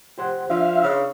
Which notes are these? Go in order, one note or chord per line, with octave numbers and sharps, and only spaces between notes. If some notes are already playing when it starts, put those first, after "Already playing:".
G4 C5 F#5
F3 D4 E5 F5
C#3